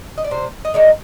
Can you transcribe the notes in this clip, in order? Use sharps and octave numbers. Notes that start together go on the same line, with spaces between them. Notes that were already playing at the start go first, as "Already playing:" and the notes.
D#5
D5
C3 C5
D#5
D#3 G#3 D5